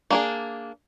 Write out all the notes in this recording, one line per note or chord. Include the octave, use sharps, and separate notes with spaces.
A#3 D4 G#4